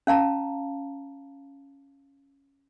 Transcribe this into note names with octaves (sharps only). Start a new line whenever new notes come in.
C#4 F5 A5 A#5